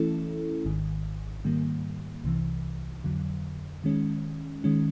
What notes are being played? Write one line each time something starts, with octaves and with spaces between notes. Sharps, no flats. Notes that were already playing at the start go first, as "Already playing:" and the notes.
Already playing: E3 A3 C#4 E4 A4
G#1 G#2 D#3
G#2 D#3 G3 A#3
C2 C3 E3
F2 D3 F#3
D#3 G#3 C#4
D#3 G#3 C#4